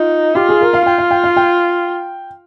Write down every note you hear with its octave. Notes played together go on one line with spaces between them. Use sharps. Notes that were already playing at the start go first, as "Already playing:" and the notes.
Already playing: D#4 F4
F4 G4
G#4
A#4
F5
F4 G5
F5
G5
F5
G5